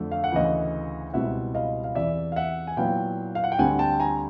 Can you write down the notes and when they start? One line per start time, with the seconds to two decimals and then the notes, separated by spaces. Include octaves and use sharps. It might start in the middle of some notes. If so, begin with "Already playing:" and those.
Already playing: F2 D3 F3 A3
0.12 F5
0.24 F#5
0.32 D2 C#3 E3 D#5 F5
1.13 C#2 B2 G3 C4 E4 E5 F#5
1.55 D#5 F5
1.84 F5
1.95 E2 C3 E3 D5 E5
2.32 F5
2.36 E5 F#5
2.67 G#5
2.77 A#2 F#3 B3 E4 F5 G5
3.35 F5
3.44 F#5
3.52 G5
3.58 D2 D3 G3 C4 F#5 G#5
3.79 G5 A5
4.00 G#5 A#5